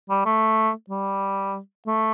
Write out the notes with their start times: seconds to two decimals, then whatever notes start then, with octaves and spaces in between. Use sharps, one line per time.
0.10 G3
0.26 A3
0.90 G3
1.87 A3